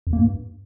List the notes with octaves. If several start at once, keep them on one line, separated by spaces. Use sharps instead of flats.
F2
A#3
G2